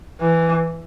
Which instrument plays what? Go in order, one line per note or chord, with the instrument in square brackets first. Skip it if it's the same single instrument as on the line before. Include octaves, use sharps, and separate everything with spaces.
[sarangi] E3